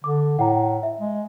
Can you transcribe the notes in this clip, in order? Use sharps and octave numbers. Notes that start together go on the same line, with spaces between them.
D3 D6
A2 F#5 G5 A#5
E5
G#3